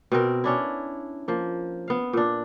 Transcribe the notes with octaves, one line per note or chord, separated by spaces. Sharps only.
B2 C4 A#4
C#4 D4 E4
F3 A#3
B3 F5
A#2 D4